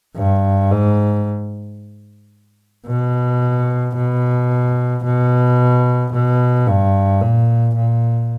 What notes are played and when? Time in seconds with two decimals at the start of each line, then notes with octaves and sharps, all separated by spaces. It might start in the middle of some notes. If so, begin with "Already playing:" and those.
0.16 G2
0.71 G#2
2.87 B2
3.97 B2
5.05 B2
6.14 B2
6.67 G2
7.21 A#2
7.75 A#2